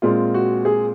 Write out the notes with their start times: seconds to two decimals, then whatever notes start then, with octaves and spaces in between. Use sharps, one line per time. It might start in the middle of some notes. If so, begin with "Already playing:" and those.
0.02 A#2 G#3 C4 F4
0.34 F#4
0.65 G#4